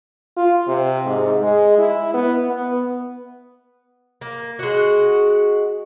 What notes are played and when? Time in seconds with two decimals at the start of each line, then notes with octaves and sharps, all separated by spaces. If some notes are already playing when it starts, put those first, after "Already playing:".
0.37 F4
0.68 C3
1.06 G#2
1.42 G#3
1.78 E4
2.14 B3
2.50 B3
4.21 A#3
4.59 G#3 F#4